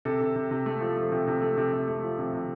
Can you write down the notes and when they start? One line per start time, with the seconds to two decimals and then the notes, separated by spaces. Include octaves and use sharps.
0.05 C3 A4
0.21 C3
0.36 C3
0.51 C3
0.66 A3
0.81 F3
0.96 A3
1.12 C3
1.27 C3
1.41 A3
1.57 C3
1.72 C3
1.88 A3
2.03 F3
2.19 C3
2.34 C3